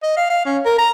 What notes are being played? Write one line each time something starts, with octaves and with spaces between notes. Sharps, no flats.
D#5
F5
F5
C#4
A#4
A#5